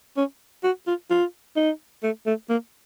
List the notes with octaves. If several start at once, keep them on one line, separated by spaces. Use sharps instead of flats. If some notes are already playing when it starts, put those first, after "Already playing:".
C#4
F#4
F4
F4
D#4
A3
A3
A#3